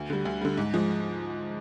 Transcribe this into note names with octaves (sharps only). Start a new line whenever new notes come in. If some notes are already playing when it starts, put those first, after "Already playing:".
Already playing: D2
D3 G3
D2
D3 G3
G#2
F3 G#3